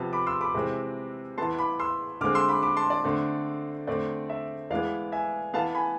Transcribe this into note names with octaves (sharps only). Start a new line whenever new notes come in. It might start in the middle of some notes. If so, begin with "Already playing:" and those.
Already playing: C3 F3 B3 A5
B5 D6
C6 E6
B5 D6
C3 E3 G#3 C4
E3 B3 A5 C6
B5 D6
C6 E6
D3 G#3 C4 D6 F6
C6 E6
B5 D6
B5 D6
A5 C6
D5
D3 A3 C4
D3 A3 C4 D5
E5
E3 G#3 B3 D5 F5
E5 G#5
E3 B3 F5 A5
G#5 B5